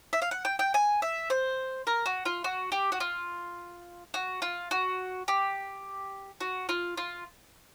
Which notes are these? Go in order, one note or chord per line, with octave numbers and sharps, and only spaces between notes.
E5
F5
F#5
G5
G5
G#5
E5
C5
A#4
F#4
F4
F#4
G4
F#4
F4
F#4
F4
F#4
G4
F#4
F4
F4